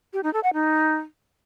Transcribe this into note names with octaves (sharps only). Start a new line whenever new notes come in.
G4
D#4
A4
F#5
D#4